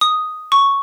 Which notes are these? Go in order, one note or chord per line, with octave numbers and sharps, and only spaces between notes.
D#6
C#6